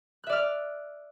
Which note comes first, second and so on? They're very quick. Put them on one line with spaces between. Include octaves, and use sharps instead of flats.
F#6 E5 D5 F6